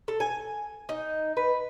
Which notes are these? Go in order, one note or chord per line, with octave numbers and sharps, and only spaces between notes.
A4
G#5
D#4
B4